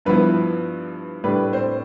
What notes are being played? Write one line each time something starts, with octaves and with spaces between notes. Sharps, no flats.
G2 F3 B3 E4 B4
A2 G3 D4 B4
C4 C5